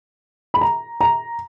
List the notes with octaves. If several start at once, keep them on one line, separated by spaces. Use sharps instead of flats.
B5
A#5
A#5